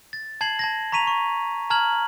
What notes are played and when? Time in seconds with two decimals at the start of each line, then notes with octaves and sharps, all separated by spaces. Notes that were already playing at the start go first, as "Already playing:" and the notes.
0.13 A6
0.41 A5 G#6 C7 F#7
0.59 A5 G#6 A#6
0.92 A#5 C#6 B6 D#7 F7
1.07 C#6
1.70 A5 A#5 F6 G#6 F#7